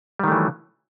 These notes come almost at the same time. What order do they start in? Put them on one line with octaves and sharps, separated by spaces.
G3 D#3 A3 E3 F#3